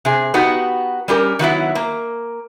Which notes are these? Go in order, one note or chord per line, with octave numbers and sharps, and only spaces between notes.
C3 G#4
B3 D#4 F#4 G4
G3 C#4 G4 A#4
D#3 F#3 B3 E4
A#3